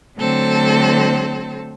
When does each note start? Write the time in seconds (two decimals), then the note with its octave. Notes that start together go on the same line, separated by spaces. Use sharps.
0.17 D3 F#3 A3 C4 A4 C5